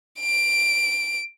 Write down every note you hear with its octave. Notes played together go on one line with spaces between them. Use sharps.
D7